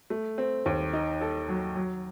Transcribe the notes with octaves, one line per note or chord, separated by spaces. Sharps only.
A3
C4
D#2
D#4
A4
F#3
F#3